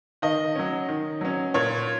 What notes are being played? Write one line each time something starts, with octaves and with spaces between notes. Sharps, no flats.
D#3 D#5
F#3 C#4
D#3
F#3 C#4
A#2 C#5